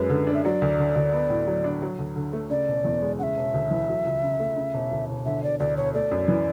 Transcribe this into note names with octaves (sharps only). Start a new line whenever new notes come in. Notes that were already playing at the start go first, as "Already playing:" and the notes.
Already playing: F#2 G#3 B4
D3
D4
E5
F#3 D5
D2
D3
D2
B3
A2
F#3
D4
F#3
D2
D3
A3
C#3 D5
E1
E2
G#3
C#3 E5 F#5
E1
D2
E3
F#3
C#2
C#3
A3
C#3
E1
D2
E1
D3 E5
E1 D5
D2 D5
E1 C#5
A3 D5
F#2
E3